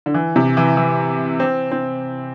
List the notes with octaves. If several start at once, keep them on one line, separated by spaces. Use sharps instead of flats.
D3
E3
C3
E3
E3
C4
C4